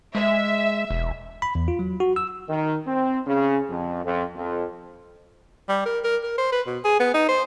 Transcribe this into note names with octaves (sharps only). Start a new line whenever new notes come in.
G#3 E5
E1
B5
E2
F4
F#3
F#4
E6
D#3
C4
C#3
F2
F2
F2
G3
A#4
A#4
A#4
C5
B4
B2
G#4
B3
D#4
C5